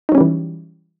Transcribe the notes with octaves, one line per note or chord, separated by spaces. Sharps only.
E3 F#3 G3 C#4 D#4